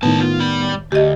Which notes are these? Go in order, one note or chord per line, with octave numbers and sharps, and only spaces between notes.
C#2 A2 D#3 B3 A5
F4
G3 B5
D2 G4 D#5